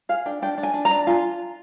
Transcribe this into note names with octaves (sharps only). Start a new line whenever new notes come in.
G#4 F5
D4 G5
D4 G5
D4
G#5
D4
A#5
D4
F4 G#5